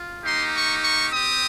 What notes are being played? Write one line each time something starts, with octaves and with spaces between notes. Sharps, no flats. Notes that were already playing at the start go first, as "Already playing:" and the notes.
Already playing: F4
A#3 D#4 G4 C6
C#6
C#6
C4 G4 D#6